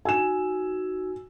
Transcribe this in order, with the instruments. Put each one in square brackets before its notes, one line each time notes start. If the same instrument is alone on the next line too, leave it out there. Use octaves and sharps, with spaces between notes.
[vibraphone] D#4 F#4 E6 [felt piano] G#5 E7